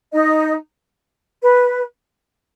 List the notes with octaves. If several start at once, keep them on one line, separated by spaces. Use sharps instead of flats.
D#4 D#5
B4